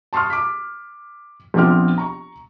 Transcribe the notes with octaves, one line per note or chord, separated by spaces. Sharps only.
A5 C6 C#6 D#6 F6
D6 F6 B6
A#1 F3 B3 C4 D6 F6
A#5 C#6